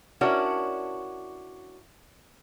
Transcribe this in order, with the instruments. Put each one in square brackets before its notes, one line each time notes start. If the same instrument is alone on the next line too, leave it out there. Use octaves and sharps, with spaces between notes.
[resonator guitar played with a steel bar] C#4 D4 E4 F#4 A#4 C#5